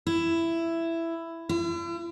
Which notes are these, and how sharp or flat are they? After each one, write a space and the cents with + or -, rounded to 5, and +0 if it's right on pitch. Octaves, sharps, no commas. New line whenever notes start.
E4 +10
E4 +45